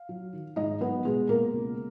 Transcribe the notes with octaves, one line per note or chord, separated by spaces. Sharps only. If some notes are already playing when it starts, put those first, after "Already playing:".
Already playing: F5
F#3
D#3
G#2 D#4 D#5
F#3 B3 B4
B2 G#3 G#4
B2 A#3 A#4
C#2